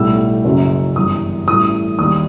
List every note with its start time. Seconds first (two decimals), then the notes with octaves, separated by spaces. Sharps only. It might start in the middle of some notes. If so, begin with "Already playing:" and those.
Already playing: B1 A2 G3 E6
0.45 F#1 F#2 F#3
0.96 G1 F#2 E3 G3 D#6
1.48 A1 A2 E3 G3 D#6
1.99 D#2 D#3 G3 D#6